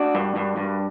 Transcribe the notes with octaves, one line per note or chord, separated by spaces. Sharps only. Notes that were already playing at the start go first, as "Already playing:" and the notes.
Already playing: D4 F#4
G2
G2
G2